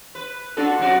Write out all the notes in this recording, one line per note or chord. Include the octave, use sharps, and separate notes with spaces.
B4
D4 F4 F#4 A4
C3 F#3 F#4 D5